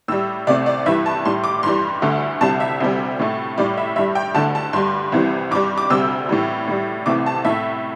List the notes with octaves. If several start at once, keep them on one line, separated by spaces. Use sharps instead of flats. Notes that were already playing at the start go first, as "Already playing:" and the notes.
A2 G3 E6
C2 C3 A3 D5
D5
G2 E3 G3 E5
A5
A2 G3 C6
D6
G2 E3 G3 C6
D2 D3 A3
C2 C3 G3 A5
E5
D2 C3 G3
A2 A3
A2 G3 D5
E5
G2 G3 E5
G5
D2 D3 A3 A5
A5
G2 G3 C6
C2 C3 E3 G3
G2 G3 D6
D6
D2 C3 G3 E6
A2 E3 G3
A2 G3
C2 C3 E3 A3 D6
A5
A2 A3 E5